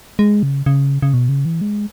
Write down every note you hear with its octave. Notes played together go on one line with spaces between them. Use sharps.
G#3
C#3
C#3
C#3
B2
C#3
E3
G#3